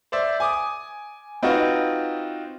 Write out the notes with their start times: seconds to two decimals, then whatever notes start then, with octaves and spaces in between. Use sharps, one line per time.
0.12 C5 D5 E5
0.40 G#5 D6 D#6
1.43 C4 D#4 F4 F#4 B4